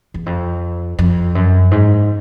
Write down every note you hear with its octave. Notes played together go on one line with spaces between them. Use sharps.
E2
F2
F2
F#2
G#2